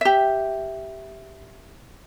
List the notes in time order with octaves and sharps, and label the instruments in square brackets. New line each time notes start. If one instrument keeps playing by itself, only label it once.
[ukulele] G4 E5